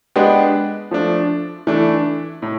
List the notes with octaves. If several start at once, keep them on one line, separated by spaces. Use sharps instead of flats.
G#3 B3 D4 G4
F3 A3 D4
E3 A3 D4
A2